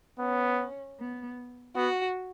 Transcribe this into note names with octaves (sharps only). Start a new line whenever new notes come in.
B3 C#4
B3
B3 F#4